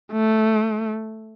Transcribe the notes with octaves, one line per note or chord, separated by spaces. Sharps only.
A3